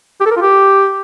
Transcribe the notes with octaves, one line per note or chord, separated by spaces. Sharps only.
G4
A4
A#4
F4
G4